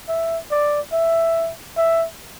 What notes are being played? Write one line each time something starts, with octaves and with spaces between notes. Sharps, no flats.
E5
D5
E5
E5